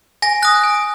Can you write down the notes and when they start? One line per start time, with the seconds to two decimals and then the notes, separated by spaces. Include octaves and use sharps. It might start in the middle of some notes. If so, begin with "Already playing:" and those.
0.22 G#5 A#6
0.43 D#6 F#6 A#6
0.64 G#5